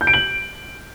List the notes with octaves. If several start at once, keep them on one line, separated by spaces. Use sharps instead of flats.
G6
D7
F#7